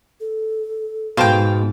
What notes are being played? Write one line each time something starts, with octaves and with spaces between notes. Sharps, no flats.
A4
G#2 B2 C5 F5 G5 A5